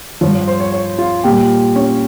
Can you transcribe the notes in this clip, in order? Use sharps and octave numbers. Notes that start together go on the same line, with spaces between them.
G2 F3 C#5
C#5
C5
C#5
C#5
F4
A#2 G3 G4
C#4